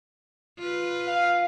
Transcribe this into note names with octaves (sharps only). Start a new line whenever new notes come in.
F4 B4
F5